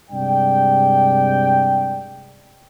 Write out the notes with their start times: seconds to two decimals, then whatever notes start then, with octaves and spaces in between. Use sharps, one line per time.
0.11 G2 C3 G#3 D5 G5